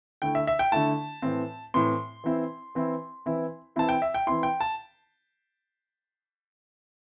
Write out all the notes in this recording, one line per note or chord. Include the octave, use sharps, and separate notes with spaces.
D3 A3 E4 G5
E5
E5
G5
D3 A3 E4 A5
A2 E3 C4
A2 E3 C4 C6
E3 C4 E4
E3 C4 E4
E3 C4 E4
E3 C4 E4 A5
G5
E5
G5
E3 C4 E4 C6
G5
A5